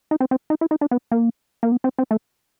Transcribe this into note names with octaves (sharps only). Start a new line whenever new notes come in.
D#4
C4
C4
D#4
E4
D#4
D4
B3
A#3
A#3
B3
C4
C4
A3